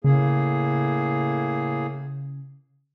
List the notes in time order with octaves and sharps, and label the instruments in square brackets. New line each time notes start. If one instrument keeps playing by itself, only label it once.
[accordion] A2 A#3 G#4 [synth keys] C#3